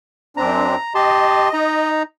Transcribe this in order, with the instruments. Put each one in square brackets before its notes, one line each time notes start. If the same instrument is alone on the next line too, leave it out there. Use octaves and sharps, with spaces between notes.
[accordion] F#2 C4 D4 [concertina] A#5
[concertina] G4 A5 C6 [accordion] D#5
[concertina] D#4 A#5